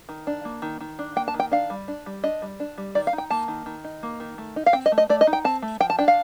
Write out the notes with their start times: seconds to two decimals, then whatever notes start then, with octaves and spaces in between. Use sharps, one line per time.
0.09 D#3
0.27 D4
0.45 A#3
0.62 D#3
0.80 D#3
0.99 D4
1.16 A#3 G5
1.28 A5
1.34 D#3
1.40 G5
1.51 D4 F5
1.70 G3
1.88 D4
2.06 G3
2.24 D4 D#5
2.42 G3
2.60 D4
2.78 G3
2.95 D#3 D5
3.07 F5
3.13 D#4
3.18 G5
3.30 A#3 A5
3.48 D#3
3.66 D#3
3.84 D#4
4.03 A#3
4.20 D#3
4.38 A3
4.56 D#4
4.66 F5
4.73 C4 G5
4.86 D#5
4.92 A3
4.98 D#5
5.09 A3 D5
5.21 D#5
5.27 D#4
5.33 G5
5.45 C4 A5
5.62 A3
5.80 F3 G5
5.90 A5
5.99 D4 G5
6.08 F5